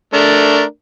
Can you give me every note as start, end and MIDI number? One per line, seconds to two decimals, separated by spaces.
0.14 0.62 57
0.14 0.62 62
0.14 0.62 70